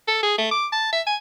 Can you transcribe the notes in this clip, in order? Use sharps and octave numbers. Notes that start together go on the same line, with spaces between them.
A4
G#4
A3
D6
A5
E5
G#5